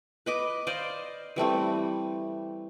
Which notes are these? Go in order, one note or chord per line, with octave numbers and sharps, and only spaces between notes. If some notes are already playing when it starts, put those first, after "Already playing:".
B4 D#5 D6
C5 D5 D#5 F5
E3 G3 A3 C4